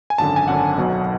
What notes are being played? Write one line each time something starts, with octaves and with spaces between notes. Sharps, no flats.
G#5
G#1 F#2 D3 A5
G#5
G#1 F#2 D3 F#5
B1 B2 F#3